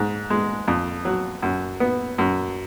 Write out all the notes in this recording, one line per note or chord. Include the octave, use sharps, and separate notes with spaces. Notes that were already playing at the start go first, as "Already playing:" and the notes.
Already playing: G#2
G#3
F2
F#3
F#2
B3
F#2